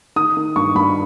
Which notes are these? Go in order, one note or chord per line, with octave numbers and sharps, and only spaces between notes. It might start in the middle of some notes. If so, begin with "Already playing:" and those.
D#3 D#6
D#3
G2 C#6
G2 B5